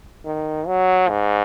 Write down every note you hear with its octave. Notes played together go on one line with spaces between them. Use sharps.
D#3
F#3
G#2